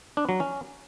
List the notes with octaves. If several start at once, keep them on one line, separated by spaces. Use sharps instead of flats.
D4
F#3
C#4